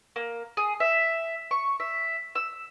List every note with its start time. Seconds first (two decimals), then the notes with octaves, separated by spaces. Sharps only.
0.16 A#3
0.57 G#4
0.80 E5
1.51 C#6
1.80 E5
2.35 E6